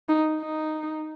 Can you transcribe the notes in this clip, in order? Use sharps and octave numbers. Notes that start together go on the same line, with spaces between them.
D#4
D#4